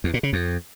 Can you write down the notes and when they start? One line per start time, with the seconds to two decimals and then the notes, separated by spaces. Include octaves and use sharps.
0.04 E2
0.14 A#2
0.23 C#3
0.33 F2